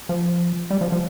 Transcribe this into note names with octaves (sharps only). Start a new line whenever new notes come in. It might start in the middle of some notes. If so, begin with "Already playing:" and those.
F3
G3
F3
F3